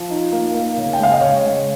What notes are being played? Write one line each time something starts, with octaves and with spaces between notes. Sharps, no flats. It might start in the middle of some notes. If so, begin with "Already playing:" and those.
Already playing: F3
D#4
A#3
A#3
C#3
G5
G#3 F5
D#5
C#3 C#5
G#3